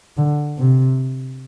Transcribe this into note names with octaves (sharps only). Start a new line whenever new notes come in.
D3
C3